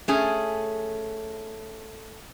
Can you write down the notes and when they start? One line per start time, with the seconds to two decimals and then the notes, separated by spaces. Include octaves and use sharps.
0.08 A3 C#4 G#4